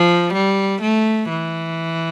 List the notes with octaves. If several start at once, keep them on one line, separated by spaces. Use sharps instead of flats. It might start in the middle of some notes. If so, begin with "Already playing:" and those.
Already playing: F3
G3
A3
E3